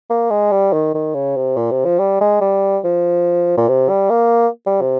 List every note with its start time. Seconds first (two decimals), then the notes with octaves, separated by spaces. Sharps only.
0.10 A#3
0.30 G#3
0.52 G3
0.73 D#3
0.95 D#3
1.15 C#3
1.36 C3
1.57 A#2
1.71 C3
1.85 F3
1.99 G3
2.21 G#3
2.41 G3
2.84 F3
3.57 A#2
3.68 C3
3.90 G3
4.10 A#3
4.66 G3
4.81 C3